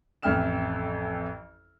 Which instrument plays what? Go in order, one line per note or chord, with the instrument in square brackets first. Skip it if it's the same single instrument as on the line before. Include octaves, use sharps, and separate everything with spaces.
[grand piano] A1 F2 E5 G5 F6 E7